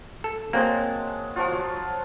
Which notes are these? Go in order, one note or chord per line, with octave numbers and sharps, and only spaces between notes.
A4
F#3 G#3 A#3 C4 C5 A5
F3 F#3 F4